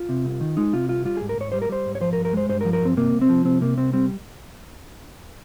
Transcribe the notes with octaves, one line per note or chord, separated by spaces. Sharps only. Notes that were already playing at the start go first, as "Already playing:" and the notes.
Already playing: F4
C3
C2
D#3
G#3 D#4
C3 F4
C2 F4
G3 F4
G#2 G#4
A#4
G#2 C#5
G3 C5
A#4
G3 C5
G#2
C#5
F3 C5
A#4
G2
A#4
G#3 C5
G2 C5
A#4
F3
A#4
G2 C4
C3 A#3
C2
C4
F3
C2 C4
C3 A#3
C2 C4
G3 C4